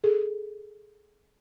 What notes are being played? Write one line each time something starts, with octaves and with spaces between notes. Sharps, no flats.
G#4 A4